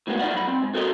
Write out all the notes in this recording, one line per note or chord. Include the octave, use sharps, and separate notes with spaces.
A2 F#3 G#3 A#3 B3
D#4 F4 D5 E5 F#5
F#3 B5
C4
G#2
F#4 A4 A#4 C5 C#5 D#5